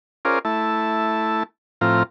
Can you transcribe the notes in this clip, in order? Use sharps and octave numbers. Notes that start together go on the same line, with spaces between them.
C#4 F4 G#4 A#4 C5 D5
A3 E4 A5
A2 F3 C4 F4 A#5